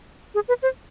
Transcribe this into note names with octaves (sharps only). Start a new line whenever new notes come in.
G#4
B4
C5